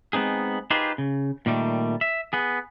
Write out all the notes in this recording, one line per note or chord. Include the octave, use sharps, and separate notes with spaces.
G#3 B3 C4 D#4 G#4
D#4 F4 G4 G#4 B4 C5
C#3
A#2 D#3 G3 A3
E5
B3 G#4